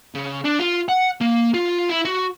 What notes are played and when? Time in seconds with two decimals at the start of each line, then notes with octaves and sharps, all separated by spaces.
0.15 C#3
0.44 D4
0.59 F4
0.89 F#5
1.21 A#3
1.54 F4
1.89 E4
2.05 F#4